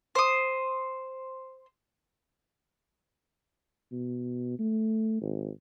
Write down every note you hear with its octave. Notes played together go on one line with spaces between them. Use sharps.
C5 D#6
B2
A3
G#1